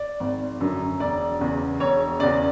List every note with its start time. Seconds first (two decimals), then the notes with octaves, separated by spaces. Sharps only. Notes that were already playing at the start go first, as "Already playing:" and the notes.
Already playing: D5
0.20 G#1
0.60 F#2 D3 F#3
1.00 E1 D5
1.40 E2 C#3
1.80 E1 C#5
2.20 E2 C#3 D5